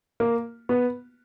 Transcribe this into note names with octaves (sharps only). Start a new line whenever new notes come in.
A#3
B3